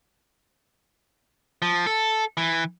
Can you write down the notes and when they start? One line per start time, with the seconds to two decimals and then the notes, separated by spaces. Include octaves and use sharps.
1.62 F3
1.87 A4
2.37 E3